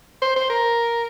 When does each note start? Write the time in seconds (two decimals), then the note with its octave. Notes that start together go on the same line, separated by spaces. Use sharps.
0.22 C5
0.36 C5
0.50 A#4